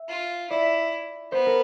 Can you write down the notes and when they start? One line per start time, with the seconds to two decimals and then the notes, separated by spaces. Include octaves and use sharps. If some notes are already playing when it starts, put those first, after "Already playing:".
Already playing: E5
0.09 F4
0.50 E4 D5
1.32 B3 C5
1.46 A#4